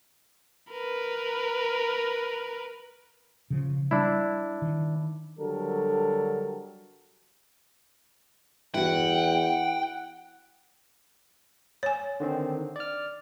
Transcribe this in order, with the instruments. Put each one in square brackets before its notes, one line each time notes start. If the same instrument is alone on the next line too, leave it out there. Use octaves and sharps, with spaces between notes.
[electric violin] A#4 B4
[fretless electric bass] C#3 F3
[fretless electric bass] G3 [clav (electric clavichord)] D4 E4
[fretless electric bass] D#3
[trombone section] D3 F#3 G3 A4 A#4
[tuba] E2 [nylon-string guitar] E4 F#4 [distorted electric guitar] F#5 [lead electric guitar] G5
[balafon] C#5 G#5
[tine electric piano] D3 D#3 C4
D5 F6